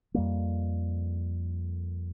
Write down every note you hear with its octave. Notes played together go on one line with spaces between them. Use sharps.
F2 G3 A#3